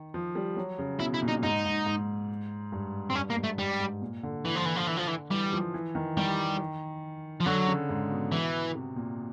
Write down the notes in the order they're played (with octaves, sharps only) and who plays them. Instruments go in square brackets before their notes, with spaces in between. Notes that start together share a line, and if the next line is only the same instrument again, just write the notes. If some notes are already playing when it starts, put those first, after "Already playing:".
Already playing: [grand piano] D#3
F3
G3
F#3
C#3
[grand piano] B2 [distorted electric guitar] E4
[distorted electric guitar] E4
[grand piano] A#2
[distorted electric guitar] D#4
[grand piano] G#2 [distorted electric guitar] D#4
[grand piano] G#2
G#2
G2
[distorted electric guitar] C4
[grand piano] G2 [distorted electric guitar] C#4
[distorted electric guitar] A#3
[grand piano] G#2
[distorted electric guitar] A3
[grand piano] G2 [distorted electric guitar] G3
[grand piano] G#2
A#2
D3
[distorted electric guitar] E3
F3
E3
F3
E3
F3
E3
[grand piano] E3 [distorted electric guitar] G3
[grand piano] F3
E3
D#3
[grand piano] D#3 [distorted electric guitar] G3
[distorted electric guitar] F3
[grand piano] D3 [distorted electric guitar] F#3
[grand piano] C#3
G#2
B2
[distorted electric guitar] E3
[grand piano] C3
A#2